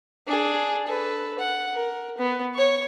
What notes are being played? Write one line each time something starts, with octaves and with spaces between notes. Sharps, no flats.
D4 G#4
A4 B4
F#5
A#4
B3
C#5 C#6